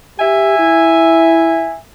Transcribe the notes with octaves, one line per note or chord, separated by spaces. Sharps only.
G4 E5 G#5
E4